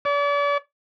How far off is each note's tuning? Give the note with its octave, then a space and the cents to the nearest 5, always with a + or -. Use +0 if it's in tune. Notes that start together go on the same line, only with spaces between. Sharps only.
D5 -40